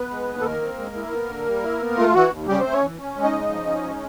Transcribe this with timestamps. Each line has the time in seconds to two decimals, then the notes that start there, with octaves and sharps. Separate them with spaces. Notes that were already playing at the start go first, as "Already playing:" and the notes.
Already playing: B3 B4
0.11 G#3
0.28 D#2
0.41 A4
0.45 D#3 A#3 A#4
0.61 C4
0.78 G#3
0.96 E4
1.12 B3
1.29 D3
1.46 G3
1.63 E4
1.80 B3
1.97 A3 F4
2.14 E3 F#4
2.31 D#2
2.47 C#3 G3 G4
2.60 A3 C4 C5
2.73 C#4 C#5
2.81 E3
2.99 C#4
3.16 G#3
3.24 D#4 D#5
3.33 C#3
3.49 F3
3.66 C#4
3.83 G#3